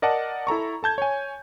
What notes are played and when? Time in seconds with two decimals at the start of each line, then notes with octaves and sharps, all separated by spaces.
0.02 A#4 D5 D#5 F#5 A5
0.47 E4 A4 A#5 C#6
0.83 A4 A5 G6 G#6
0.98 C#5 G#5